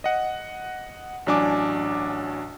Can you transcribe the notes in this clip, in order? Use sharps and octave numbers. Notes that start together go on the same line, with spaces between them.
D#5 F#5
A1 F#3 D4 G#5 D6